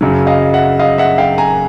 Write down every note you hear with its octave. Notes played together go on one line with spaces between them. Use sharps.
F#2 C#3 F#3
D#5 F5
E5 F#5
D#5 F5
E5 F#5
F5 G5
G#5 A#5